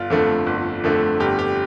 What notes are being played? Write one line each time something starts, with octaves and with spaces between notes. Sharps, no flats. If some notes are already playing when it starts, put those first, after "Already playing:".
Already playing: G1 F4
F2 D3 A3
G1
F2 D3 A3
G1 G4
G4